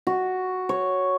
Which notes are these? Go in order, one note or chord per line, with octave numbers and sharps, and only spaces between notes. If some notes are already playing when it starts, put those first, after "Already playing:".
F#4
C#5